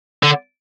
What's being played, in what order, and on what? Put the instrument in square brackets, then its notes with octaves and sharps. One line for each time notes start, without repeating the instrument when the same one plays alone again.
[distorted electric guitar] D3